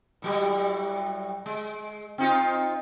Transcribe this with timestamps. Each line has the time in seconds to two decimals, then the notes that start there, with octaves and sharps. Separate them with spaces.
0.22 A2 F#3 G3
1.46 G#3
2.18 C4 D#4 F4